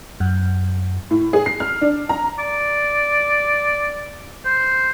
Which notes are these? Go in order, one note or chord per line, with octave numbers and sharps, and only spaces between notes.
F#2
A2
G#4
C7
F6
D4
A#5
D5
C5